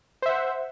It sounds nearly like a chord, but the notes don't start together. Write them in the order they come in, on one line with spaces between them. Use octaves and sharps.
C5 E5 F#5